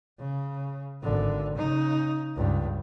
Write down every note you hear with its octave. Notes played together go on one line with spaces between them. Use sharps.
C#3
G#1 D3
C#3 D#4
C#2 G2